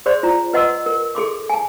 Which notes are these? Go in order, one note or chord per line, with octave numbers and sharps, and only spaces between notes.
G#4 C5 D5 C6
F4 A#5
B4 D#5 F#5 C6 E6
A#4
G#4 A4 C6 D6
G#5 A5